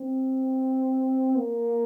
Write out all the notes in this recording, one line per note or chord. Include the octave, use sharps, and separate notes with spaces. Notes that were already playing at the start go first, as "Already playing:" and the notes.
Already playing: C4
A#3